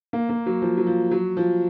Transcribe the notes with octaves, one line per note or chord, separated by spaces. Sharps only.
A#3
A#3
F#3
F3
F#3
F3
F#3
F3